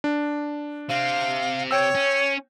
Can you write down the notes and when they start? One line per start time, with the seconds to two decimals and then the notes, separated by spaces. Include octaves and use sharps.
0.04 D4
0.89 C3 C4 F5
1.71 C#5 G5 E6
1.95 C#4